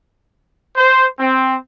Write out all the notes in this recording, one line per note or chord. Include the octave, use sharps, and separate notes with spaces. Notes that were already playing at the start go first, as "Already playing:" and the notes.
C5
C4